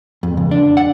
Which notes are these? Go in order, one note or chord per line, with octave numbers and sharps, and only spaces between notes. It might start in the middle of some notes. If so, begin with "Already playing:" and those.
F2
C#2
D4
F#5